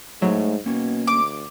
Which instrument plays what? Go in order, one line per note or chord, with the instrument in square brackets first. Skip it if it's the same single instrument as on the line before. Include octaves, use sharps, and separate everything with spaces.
[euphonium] G#2 [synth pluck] F#3 [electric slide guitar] A3 C#5 E5
[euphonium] B2 [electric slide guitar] A#3 C#4
[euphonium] D2 [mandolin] D6